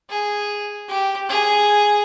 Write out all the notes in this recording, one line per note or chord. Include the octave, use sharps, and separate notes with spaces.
G#4
G4
G#4